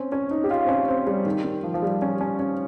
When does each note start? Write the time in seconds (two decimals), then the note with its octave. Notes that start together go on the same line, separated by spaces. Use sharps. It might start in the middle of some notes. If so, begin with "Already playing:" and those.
Already playing: C4 C#4
0.12 C#4
0.31 D#4
0.44 G4
0.51 F4
0.64 C4
0.68 C#4
0.88 C4
1.07 G3
1.26 D#3
1.44 D#3
1.64 F3
1.74 F3
1.82 G3
2.02 C#4
2.21 C#4
2.39 C#4